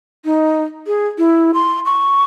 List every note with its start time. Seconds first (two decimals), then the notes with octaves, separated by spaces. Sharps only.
0.25 D#4
0.87 G#4
1.18 E4
1.54 C6
1.86 C#6